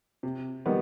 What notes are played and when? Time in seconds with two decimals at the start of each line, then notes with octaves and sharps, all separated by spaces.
0.23 C3
0.66 D#3 G3 B3